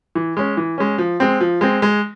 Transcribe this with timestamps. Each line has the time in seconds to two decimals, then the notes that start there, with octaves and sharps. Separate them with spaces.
0.15 E3
0.37 G#3 C#4
0.57 E3
0.78 G#3 C#4
0.98 F3
1.20 G#3 C4
1.40 F3
1.61 G#3 C4
1.82 G#3